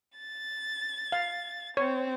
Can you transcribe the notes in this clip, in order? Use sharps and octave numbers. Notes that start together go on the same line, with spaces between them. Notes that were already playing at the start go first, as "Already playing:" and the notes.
A6
F5
C4 C#5